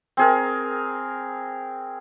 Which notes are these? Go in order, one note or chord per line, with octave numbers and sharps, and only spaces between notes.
C4 G#4 A#4